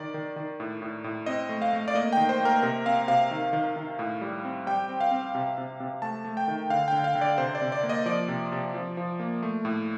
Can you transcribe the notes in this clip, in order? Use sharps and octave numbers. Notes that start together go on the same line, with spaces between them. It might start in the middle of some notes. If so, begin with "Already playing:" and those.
Already playing: D#3 D5
D#3
D#3
A2
A2
A2
C4 D#5
A3
F5
A3
D5
A#3 D#5
D#3 G5
C5
A#3 A#4
C3 A#4
C4 F5
C3 F5
D#3
D#3
D#3
A2
G3
C4
G3 G5
C4
F5
C4
C3
C3
C3
A3 A5
A3
G5
D#3
D3 F5
D3 G5
F5
D3
D5
C3 C5
D5
C3
D5
A#3
D#5
F3 D5
C3
C3
F3
F3
A#3
A3
A2